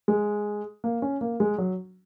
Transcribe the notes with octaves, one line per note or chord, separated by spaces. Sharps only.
G#3
A#3
C#4
A#3
G#3
F#3